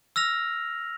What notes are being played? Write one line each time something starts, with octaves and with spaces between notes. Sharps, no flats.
E6 F6 A#6 F7